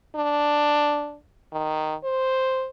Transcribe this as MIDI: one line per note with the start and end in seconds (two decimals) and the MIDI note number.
0.16 1.16 62
1.53 1.95 51
2.04 2.67 72